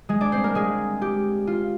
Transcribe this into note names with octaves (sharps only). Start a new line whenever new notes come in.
G#3 G#4
D4 D5
C4 C5
A#3 A#4
G#3 G#4
G4
F4